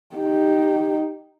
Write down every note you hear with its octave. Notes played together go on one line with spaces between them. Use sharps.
D#4 G4